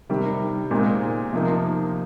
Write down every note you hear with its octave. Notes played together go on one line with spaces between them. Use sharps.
C3 D#3 G3
A#2 G#3 C4 D#4
C3 F3 A#3 D#4